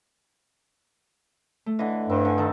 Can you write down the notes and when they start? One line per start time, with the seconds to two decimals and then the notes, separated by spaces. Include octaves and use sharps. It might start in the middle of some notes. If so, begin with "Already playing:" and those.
1.66 A3
1.79 D3 E3 D#5
2.10 G2 C4
2.25 D3 C#4 G#5
2.38 D#3 D#4 A4